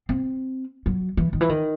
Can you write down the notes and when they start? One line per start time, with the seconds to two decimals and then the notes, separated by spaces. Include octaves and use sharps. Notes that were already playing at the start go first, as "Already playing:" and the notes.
0.09 C4
0.86 F#3
1.17 E3
1.33 D#3
1.41 E3
1.49 D#3